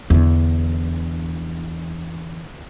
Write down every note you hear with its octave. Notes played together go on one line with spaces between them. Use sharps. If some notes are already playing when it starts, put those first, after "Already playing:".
E2 D3